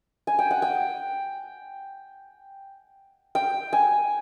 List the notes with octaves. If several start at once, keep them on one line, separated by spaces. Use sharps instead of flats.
G#5
G5
F#5
G5
G5
G#5